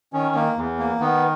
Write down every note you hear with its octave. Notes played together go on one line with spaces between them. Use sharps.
D#3 C#4
A#3
E2
A#3
D#3 B3